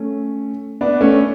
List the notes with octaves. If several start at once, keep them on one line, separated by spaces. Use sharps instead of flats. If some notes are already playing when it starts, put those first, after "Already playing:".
Already playing: A3 C#4
B3 D4
A3 C#4